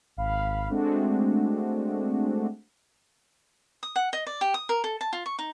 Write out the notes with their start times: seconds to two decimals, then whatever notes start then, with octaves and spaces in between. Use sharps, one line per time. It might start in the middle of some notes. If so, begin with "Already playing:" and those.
0.17 G#1 F5 B5
0.69 G#3 A3 C4 D4 F#4
3.83 D#6
3.96 F#5
4.13 D#5
4.27 D5
4.41 G4
4.54 D#6
4.69 A#4
4.84 A4
5.01 A5
5.13 F4
5.26 C#6
5.39 D#4